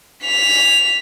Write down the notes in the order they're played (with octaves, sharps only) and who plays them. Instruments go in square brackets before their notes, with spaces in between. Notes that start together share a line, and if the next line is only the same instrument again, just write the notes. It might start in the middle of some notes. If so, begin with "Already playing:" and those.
[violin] B6 F7